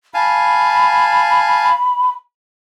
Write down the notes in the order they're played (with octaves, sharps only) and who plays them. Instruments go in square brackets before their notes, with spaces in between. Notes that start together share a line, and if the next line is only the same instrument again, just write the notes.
[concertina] F5 G#5 A5 [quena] B5